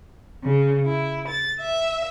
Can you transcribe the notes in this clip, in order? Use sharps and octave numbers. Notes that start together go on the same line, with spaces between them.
C#3
E4
A6
E5